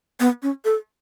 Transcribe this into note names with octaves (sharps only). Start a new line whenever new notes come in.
B3
C#4
A4